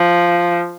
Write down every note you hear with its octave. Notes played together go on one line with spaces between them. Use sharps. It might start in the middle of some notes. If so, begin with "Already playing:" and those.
Already playing: F3